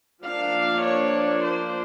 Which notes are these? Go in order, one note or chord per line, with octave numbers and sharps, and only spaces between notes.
F3 A#3 D4 F5
C#5
C5